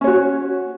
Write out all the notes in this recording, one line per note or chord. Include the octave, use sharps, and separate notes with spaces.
C#4 F#4 C#5